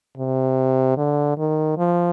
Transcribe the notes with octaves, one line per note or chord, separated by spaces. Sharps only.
C3
D3
D#3
F3